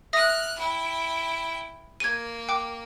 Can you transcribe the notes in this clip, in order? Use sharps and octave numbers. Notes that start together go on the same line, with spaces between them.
E5 D#6 F6 F#6 A#6
E4 G5
A#3 G#6 D#7
G5 D6